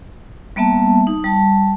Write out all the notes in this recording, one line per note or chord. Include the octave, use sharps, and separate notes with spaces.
G3 A#3 B3 E5 A5
D#4
G3 A5